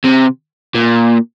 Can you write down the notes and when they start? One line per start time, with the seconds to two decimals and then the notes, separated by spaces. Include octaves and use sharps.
0.04 C3
0.75 A#2